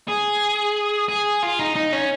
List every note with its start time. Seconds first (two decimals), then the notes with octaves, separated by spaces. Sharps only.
0.08 G#4
1.08 G#4
1.43 F4
1.59 D#4
1.76 D#4
1.93 C#4